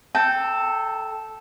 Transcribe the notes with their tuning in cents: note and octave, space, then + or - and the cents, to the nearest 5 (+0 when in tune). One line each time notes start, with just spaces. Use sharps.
A4 -5 G5 -5 A#5 -45